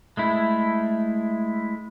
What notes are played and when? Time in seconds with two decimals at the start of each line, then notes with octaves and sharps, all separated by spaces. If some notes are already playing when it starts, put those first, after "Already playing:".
0.17 G#3 A3 E4